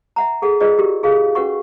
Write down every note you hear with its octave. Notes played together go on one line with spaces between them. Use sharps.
E5 F#5 A#5
G#4 A4 F#5
F4 G#4 B4 D5 D#5
F#4 G4 A#4
F4 G#4 A4 F5
C#4 F#4 B4 F#5 C#6